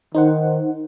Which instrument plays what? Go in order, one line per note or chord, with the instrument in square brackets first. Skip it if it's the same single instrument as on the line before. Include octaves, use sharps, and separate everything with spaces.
[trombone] D#3 [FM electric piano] D#4 C5 F#5